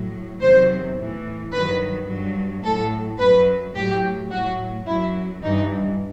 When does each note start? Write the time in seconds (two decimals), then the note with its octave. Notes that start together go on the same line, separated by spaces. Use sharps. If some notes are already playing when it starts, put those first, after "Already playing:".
Already playing: A2 F#3
0.41 E2 C3 D#3 F#3 C5
0.98 A2 E3
1.52 G2 D#3 F#3 B4
2.08 G2 F#3
2.64 A2 F#3 A4
3.19 F#2 F#3 B4
3.75 A2 F#3 G4
4.30 A2 F#3 F#4
4.87 F#2 F#3 E4
5.42 G2 E3 D#4